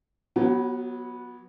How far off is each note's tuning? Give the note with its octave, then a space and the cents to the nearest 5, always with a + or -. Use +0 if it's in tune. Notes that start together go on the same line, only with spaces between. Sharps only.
F#3 -25 B3 -15 F#4 +40